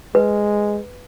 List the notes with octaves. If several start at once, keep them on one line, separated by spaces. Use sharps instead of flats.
G#3 B4